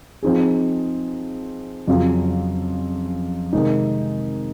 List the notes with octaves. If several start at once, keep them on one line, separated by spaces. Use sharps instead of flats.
F3 C4 D#4 G#4
F2 C#3 F#3 C#4 F4
C3 D#3 G#3 C4 D#4